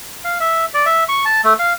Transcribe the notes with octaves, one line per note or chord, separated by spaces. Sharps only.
F5
E5
D5
E5
C#6
A5
A3
F5